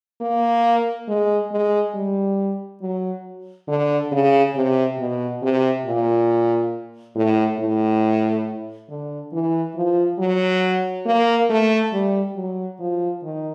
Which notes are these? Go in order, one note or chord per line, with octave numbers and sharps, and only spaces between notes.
A#3
G#3
G#3
G3
F#3
D3
C#3
C3
B2
C3
A#2
A2
A2
D3
E3
F3
F#3
A#3
A3
G3
F#3
F3
D#3